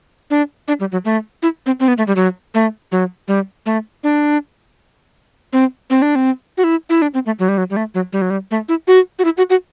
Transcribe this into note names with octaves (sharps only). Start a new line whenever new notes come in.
D4
D4
G3
F#3
A3
E4
C4
C4
B3
A3
G3
F#3
A3
F#3
G3
A3
D4
C4
C4
D4
C4
F#4
E4
E4
D4
C4
A3
F#3
G3
F#3
G3
A3
F#3
G3
F#3
G3
A3
E4
F#4
F#4
E4
F#4
F#4